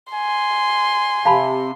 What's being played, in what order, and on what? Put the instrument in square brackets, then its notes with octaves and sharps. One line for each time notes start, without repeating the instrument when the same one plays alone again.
[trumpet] G#5 [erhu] C6
[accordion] C3 [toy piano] F5 A5 B5